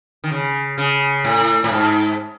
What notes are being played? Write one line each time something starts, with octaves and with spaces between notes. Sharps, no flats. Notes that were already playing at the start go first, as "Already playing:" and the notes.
D#3
C#3
C#3
A2
A2
G#2